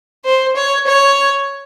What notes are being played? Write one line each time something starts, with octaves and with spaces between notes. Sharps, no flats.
C5
C#5
C#5